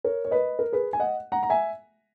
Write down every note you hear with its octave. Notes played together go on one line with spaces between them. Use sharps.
A#4 C#5
C#5
B4 D#5
A#4
G#4 B4
G#5
D#5 F#5
F#5 A#5
A#5
E5 G#5